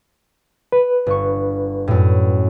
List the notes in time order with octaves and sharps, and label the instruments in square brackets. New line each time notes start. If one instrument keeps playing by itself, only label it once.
[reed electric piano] B4
[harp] G1 C#6
F#2 A2